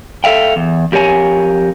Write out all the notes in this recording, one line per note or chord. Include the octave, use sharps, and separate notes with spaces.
A4 E5 F5 G5
E2
F2 G4 A#4 C#5 G#5